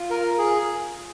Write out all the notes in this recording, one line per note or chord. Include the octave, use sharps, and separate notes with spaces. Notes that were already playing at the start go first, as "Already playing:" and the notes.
Already playing: F4
A#4
G#4